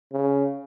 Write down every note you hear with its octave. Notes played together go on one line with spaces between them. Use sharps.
C#3